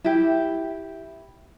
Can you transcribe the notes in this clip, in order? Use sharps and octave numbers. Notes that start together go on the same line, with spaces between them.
E4 G4